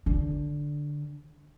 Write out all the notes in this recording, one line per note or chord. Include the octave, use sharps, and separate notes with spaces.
D3